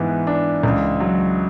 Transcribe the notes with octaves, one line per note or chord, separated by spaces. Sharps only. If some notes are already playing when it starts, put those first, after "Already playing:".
Already playing: G#2 E3 B3
D4
C#2
F#3